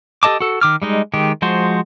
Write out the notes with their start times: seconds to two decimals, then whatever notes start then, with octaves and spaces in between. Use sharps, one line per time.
0.23 G4 A4 D#5 A5 D6
0.40 F#4 A4
0.61 D#3 D6 F6
0.82 G3 G#3 D#4
1.14 D#3 G#3 G4
1.42 F3 G#3 F#4 C5